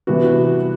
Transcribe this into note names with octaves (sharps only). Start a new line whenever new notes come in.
C3 E3 G3 B3 F#4
F#4